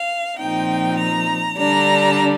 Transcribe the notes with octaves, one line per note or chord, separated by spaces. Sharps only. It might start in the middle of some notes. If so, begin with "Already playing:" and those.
Already playing: F5
A#2 F3 C4 D#4 G5
A#5
D3 G3 D4 A#5